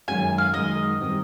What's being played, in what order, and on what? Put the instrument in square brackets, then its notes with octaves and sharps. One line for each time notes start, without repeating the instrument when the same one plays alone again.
[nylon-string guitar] F#2 D#3 G#3 C#4 F#4 [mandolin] G#5
[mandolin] F5
[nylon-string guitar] F#2 D#3 G#3 C#4 F#4 [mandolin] D#5
[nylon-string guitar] D#3 G3 C4